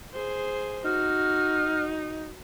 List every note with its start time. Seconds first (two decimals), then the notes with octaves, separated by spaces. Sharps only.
0.13 G#4 C5
0.85 D#4 F#4 F6